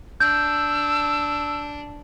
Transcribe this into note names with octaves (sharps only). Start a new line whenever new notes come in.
D4 E6 G6